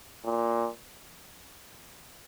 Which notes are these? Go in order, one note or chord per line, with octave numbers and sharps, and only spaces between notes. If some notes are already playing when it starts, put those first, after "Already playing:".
A#2